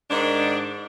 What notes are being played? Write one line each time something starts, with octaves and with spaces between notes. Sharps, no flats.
G#2 D#3 D4